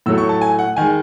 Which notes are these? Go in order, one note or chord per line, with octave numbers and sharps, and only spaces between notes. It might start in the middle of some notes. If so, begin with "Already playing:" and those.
A2 F#3 A3 E6
C#6
A5
G#5
F#5
D#3 G#3 G#5